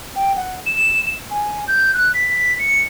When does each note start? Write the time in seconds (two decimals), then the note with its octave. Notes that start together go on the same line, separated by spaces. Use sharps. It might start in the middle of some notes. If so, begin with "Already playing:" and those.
0.16 G5
0.36 F#5
0.66 E7
1.31 G#5
1.68 G6
1.94 F#6
2.14 B6
2.59 C#7